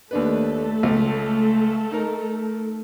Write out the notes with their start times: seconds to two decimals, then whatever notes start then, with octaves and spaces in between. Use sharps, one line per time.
0.11 D#2 A3 D4 A4 B4
0.83 C#2
1.91 D#4 A#4